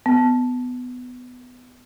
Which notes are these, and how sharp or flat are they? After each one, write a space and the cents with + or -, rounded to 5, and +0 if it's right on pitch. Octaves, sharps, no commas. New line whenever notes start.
B3 +15